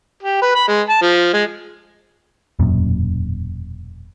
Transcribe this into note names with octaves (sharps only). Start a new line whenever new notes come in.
G4
B4
B5
G#3
A5
F3
G#3
E1 F#2 A#2